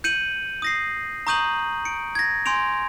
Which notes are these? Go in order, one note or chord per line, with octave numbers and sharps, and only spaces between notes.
G6 C#7 D#7 F#7
D#6 A#6 C7
A#5 C#6 D#6 G6 D#7 F#7
C#7 D7
G#6 A#6
G#5 C6 G6 D7 F7